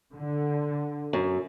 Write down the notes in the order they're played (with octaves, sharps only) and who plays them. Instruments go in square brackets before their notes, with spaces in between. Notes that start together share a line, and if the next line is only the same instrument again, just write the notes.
[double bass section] D3
[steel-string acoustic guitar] F#2